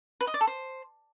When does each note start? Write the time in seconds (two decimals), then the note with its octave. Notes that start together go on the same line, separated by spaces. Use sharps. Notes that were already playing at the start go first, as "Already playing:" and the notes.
0.21 B4
0.27 D#5
0.34 D5
0.41 A4
0.47 C5